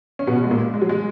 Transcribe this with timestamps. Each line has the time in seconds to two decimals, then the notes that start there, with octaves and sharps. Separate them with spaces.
0.19 C#4
0.27 B2 B3
0.44 G#3
0.51 A#2 A#3
0.74 G#3
0.82 F#3
0.89 G#3